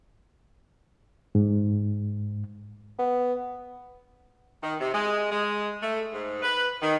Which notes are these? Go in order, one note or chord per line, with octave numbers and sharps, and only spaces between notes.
G#2
B3
D#3
C3
G#3
G#3
A3
G#2
B4
D#3